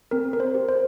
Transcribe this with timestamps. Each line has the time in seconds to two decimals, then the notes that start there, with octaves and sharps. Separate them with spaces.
0.11 C4 A#4
0.33 A#4
0.40 C5
0.55 G4
0.69 C5